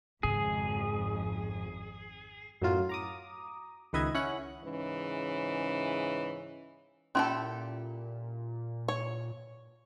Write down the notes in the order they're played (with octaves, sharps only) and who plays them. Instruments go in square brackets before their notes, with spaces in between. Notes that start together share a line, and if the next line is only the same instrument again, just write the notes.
[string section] G#1 F2 [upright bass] G#2 C#3 [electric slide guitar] G#4
[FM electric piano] F#2 A2 F#3 F4
A#5 D6 D#6
C#2 D#3 B4 D#5 E5 G#6
C#4 E4 F#5 F#6
[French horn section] G#2 C#3 E3 C#4
[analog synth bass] A#2 [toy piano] C#4 C6 [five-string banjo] E4 G4 A4
[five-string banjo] C#5